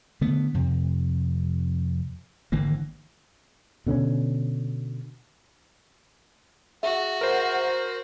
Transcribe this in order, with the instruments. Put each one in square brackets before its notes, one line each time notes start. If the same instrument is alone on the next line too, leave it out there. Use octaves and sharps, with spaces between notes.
[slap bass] D3 A3 B3
F2 C3
G#1 D3 E3 A#3
[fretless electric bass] B2 D3 C4 C#4
[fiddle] F#4 [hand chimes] G#4 E5 [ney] F#5
[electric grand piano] A#4 C5